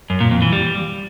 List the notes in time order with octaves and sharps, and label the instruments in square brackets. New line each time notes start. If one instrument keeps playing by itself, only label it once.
[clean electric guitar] F#2
A#2
F2
E3
G3